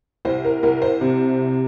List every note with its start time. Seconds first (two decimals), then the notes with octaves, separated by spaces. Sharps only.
0.25 C2 C5
0.45 A#4
0.63 C2 A#4
0.82 C5
1.01 C3